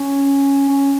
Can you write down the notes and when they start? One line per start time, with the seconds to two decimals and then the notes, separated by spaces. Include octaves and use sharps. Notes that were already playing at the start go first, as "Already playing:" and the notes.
Already playing: C#4
0.68 C#4